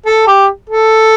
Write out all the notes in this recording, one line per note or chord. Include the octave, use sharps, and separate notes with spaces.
A4
G4
A4